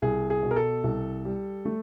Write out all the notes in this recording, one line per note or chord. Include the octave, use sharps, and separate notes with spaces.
C2 G#4
G#4
B2
A#4
A4
C2
G3
A3